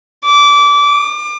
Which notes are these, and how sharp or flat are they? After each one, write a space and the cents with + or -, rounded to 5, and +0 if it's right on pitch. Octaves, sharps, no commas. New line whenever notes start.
D6 -20
D6 +35